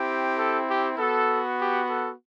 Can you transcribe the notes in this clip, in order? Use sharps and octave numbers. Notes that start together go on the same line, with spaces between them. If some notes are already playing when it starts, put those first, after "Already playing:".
Already playing: C4 E4 G4
A4
G4
B3 F#4 A4
G4
A4